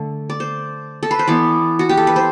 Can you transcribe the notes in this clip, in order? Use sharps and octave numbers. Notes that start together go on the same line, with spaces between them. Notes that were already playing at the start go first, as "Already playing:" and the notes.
Already playing: D3 A3
D5
C5
A4
B4
C5
E3 B3 D5
F#4
G4
A4
B4
C5